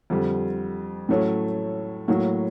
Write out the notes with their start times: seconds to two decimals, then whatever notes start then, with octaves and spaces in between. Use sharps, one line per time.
0.10 F2 D3 G3
1.09 A2 F#3 A3 C#4
2.08 A2 F#3 A#3